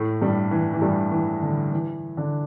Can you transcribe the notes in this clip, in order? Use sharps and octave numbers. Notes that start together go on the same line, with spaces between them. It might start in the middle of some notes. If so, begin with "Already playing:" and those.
Already playing: A2 A3
G2 G3
E3
E3
G2 G3
E3
D3
E3
D3 D4